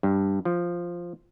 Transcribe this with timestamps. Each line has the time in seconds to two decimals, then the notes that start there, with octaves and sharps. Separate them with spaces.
0.03 G2
0.45 F3